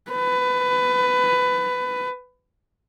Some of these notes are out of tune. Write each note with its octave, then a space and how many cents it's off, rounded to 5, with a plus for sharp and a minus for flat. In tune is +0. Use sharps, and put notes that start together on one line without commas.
B4 +20